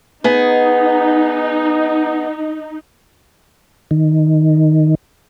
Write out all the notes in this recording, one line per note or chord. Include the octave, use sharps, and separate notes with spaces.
B3 D#4 G#4
D#3